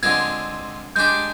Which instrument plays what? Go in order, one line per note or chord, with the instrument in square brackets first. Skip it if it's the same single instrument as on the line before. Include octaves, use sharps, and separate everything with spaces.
[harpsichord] D3 G#3 C4 F4 [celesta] G#6
[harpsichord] G#3 D4 G4 [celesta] G6